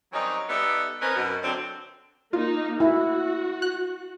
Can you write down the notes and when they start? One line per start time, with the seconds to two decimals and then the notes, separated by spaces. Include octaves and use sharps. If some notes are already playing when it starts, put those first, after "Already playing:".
0.13 D#3 F#3 G3 C4 C#4 D#4
0.49 G3 B3 D#4 A4 E5
1.01 C4 C#4 D#4 A#4 B4
1.16 F#2 B2
1.43 D3 F#3 C4
2.33 A#3 D#4 F4
2.80 E4 F#4
3.62 F#6